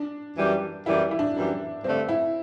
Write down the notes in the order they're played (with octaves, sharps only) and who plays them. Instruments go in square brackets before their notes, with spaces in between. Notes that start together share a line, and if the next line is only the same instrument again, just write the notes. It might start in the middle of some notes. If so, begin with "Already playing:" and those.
Already playing: [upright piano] D4
[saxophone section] F#2 E3 G3
[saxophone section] F#2 E3 G3 [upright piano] E4
[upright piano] E4
D4
[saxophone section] F#2 E3 G3
[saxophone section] G2 D3 A3 [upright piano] C4
[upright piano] E4